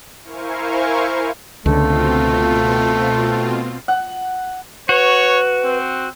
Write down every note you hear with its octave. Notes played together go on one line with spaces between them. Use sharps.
E4 A#4 C5 F5 G#5 C#6
C#2 B2 D3 A3 C4 F4
F#5
F#4 B4 C#5
C4